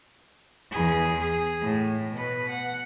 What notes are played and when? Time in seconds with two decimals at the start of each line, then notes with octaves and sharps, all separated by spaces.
0.71 E2 G#4
1.21 G#4
1.61 A2
2.13 B2 B4
2.51 F#5